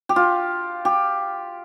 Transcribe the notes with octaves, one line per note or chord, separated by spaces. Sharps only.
G4
F4
G4